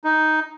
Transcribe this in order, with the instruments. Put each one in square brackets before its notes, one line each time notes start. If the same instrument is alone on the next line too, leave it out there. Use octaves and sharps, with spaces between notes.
[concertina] D#4